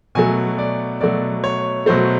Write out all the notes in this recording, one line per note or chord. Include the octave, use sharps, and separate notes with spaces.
B2 F#3 A3 G#5
D5
B2 F#3 A3 D5
C#5
B2 F#3 A3 C5